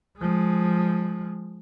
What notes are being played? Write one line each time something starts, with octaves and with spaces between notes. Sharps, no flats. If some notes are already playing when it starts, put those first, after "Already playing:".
F3 G#3